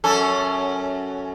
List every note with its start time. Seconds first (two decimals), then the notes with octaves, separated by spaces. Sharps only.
0.04 F#2 C#4 A4